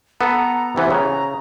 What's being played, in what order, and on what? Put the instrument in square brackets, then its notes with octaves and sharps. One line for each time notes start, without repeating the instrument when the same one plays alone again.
[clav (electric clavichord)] B3 A4 [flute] A#5
[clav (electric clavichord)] C3 E3 B3 [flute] C5
[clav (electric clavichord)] C#3 [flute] A#5